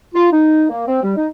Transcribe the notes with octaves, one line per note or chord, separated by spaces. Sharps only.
F4
D#4
A#3
C4
G3
D#4